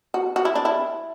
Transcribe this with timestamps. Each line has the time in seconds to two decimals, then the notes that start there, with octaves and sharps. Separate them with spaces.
0.14 F#4
0.36 F#4
0.45 E4
0.55 D4
0.65 E4